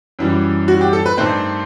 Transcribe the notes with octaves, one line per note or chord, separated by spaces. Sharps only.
F#2 E3 G3
F#4
G4
A4
B4
G2 D#3 A3 C4 C5